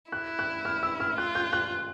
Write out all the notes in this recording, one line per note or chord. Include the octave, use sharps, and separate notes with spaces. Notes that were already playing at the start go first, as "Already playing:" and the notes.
E4 F#6
F#6
F6
E6
F6
F4 F#6
G6
F#6